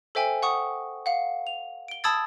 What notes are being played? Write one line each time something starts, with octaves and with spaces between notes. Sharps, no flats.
A4 C5 E5 G5 G#5
F#5 C#6 D#6
F5 F#5
F7
D7 G7
A5 B5 D#6 E6 G#6 A6